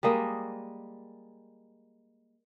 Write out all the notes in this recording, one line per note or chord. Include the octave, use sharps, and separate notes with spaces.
G3 G#3 A#3 D#5